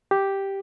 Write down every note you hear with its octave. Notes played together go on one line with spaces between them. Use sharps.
G4